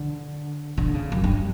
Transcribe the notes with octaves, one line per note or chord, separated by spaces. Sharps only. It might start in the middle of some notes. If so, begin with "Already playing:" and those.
Already playing: D3
D3
C#3
F#2
G2